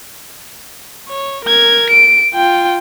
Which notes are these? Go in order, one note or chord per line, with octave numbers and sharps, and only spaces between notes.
C#5
A#4 G#6
D7
F4 G5